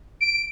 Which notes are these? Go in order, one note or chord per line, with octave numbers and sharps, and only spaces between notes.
D7